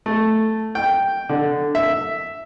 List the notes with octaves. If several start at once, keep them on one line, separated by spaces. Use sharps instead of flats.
A3
G5
D3
E5